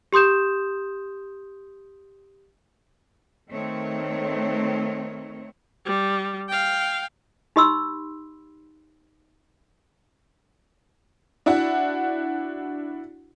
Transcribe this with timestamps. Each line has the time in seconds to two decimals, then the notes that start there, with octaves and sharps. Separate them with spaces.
0.13 G4 C6 D#6 G6 E7
3.49 D#3 A3 C4 C#5
5.86 G3
6.49 F5 G5
7.56 D#4 G4 D#5 B5 C6 E6
11.46 D4 E4 F#4 F#5